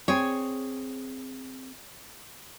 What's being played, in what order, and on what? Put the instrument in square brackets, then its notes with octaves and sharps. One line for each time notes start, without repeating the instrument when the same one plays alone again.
[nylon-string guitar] C4 G#4 C#5